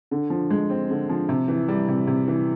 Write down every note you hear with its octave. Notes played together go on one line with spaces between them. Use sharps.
D3
F3
G#3
C4
D3
F3
C3
E3
G3
C3
C3
E3